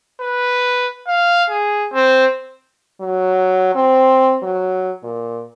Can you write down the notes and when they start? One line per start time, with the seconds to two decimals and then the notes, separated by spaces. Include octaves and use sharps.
0.21 B4
1.08 F5
1.50 G#4
1.93 C4
3.01 F#3
3.75 C4
4.42 F#3
5.03 A#2